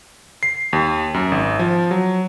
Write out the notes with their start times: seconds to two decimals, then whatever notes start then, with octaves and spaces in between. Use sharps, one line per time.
0.43 C7
0.73 D#2
1.14 F#2
1.32 G#1
1.59 F3
1.91 F#3